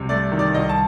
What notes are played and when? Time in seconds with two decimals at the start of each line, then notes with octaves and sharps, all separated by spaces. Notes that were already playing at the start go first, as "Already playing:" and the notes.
Already playing: C2 C3
0.09 A3 D5
0.31 D#3
0.39 D5
0.53 C2 D#5
0.69 A5